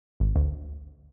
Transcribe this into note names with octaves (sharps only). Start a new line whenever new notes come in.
G#1
D2